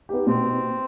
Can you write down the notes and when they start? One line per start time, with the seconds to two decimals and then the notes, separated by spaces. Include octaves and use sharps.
0.09 B3 D#4 G4
0.27 B2 C4